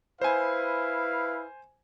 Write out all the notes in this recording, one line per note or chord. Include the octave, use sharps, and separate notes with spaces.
E4 B4 C5 F5 G#5